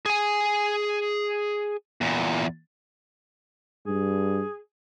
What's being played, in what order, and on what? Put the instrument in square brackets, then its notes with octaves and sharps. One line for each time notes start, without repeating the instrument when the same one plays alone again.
[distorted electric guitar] G#4 G#5
E2 A#2
[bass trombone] G2 [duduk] G#4